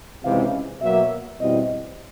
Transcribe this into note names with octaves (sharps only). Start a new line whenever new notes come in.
C#2 C3 E3 G#3 C#4 F5
B2 F#3 A#3 E5
E2 B2 G3 C4 E4 D#5